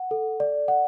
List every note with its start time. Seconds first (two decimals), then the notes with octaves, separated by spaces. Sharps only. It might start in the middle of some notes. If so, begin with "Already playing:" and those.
Already playing: F#5
0.11 A4
0.40 D5
0.68 F#5